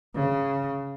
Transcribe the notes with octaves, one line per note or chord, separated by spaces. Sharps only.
C#3